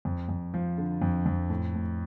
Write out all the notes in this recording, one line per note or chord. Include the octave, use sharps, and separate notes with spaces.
F2
F2
F3
D3
F2
F2
A2
A2